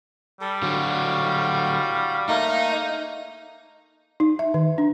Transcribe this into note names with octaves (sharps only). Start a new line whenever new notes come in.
G3 A4
D3 F#3 F#4 F5
A3 A#3 D#4 A#5
D#4
E5
D#3
D4